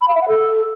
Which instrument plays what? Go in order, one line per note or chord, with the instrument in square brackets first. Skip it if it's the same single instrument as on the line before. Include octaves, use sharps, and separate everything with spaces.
[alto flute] B5
F5
E5
F#5
A4